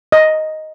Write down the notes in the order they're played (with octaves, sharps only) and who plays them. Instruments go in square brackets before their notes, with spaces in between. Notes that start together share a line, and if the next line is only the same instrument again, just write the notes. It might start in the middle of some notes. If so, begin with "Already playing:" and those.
[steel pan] D#5